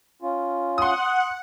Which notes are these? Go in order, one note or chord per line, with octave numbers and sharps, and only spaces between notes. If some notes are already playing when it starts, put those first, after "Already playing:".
C#4 F4
F#5 C6 D#6